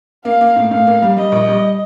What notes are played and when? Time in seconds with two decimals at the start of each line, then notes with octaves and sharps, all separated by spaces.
0.25 A#3 F5
0.41 A#3
0.56 A2
0.71 A2 F5
0.87 A#3
1.02 G3
1.17 G3 D#5
1.32 A#1
1.48 G3